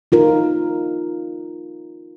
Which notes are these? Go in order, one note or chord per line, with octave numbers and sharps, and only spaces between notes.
D#4 F4 A#4